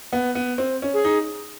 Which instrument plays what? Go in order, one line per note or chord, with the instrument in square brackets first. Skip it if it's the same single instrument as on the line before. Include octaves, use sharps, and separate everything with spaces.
[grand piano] B3
B3
C4
C#4
[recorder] G#4
[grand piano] D#4